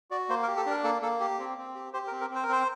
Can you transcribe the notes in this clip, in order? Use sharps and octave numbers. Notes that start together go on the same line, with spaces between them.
F#4 D5
A#3 C5
A#4
G4
A4
D4 A#4
A#3 A4
A#3 A4
G4
C4
C4
G4
G4 C5
A#4
C4
A#4
C4
C5
A#4
C4 C5